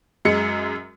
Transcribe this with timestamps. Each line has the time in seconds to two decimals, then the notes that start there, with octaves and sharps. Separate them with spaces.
0.25 F#2 G#3 C#7